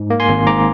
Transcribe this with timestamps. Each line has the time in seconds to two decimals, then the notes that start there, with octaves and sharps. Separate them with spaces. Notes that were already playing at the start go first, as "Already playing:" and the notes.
Already playing: G#2
0.10 A#3
0.20 G#5 C6
0.29 G#1
0.47 G#2 A#5 D6